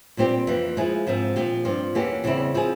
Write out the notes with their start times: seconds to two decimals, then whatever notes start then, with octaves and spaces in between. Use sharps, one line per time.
0.17 A#2 G3 C4 G4
0.47 F2 E3 A#3
0.77 F3 G#3 E4 G#4
1.07 G#2 F3 C4
1.36 A#2 F3 C4 G4
1.65 G2 F3 C4 F4
1.95 E2 E3 A#3 C#4 G4
2.24 E2 C#3 G3 C4 E4
2.54 F3 C4 E4 G#4